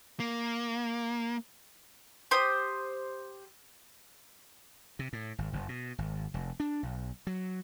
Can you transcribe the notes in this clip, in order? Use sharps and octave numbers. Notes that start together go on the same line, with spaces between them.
A#3
G4 C5 D#6
C3
A2
G#1
F#1
B2
G#1
F1
D4
B1
F#3